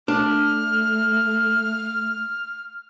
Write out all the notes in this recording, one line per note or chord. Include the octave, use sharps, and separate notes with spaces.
A3 D4 F6